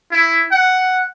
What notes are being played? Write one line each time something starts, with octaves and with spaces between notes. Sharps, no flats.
E4
F#5